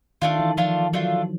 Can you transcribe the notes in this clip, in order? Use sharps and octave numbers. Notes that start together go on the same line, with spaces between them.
D#3 A3 D4 F4
E3
F3 A3 D4 F4
F#3 A3 D4 F4